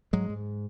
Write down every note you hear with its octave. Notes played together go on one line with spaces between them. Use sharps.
G#2 F#3 G#3
G#2